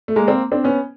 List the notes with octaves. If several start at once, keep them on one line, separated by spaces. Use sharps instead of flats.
A3
G#3 A#3
A#3 C4
C4 D4
B3 C#4